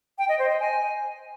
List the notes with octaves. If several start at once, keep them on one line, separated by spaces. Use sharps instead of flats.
G5
D#5
C5
D#5
G#5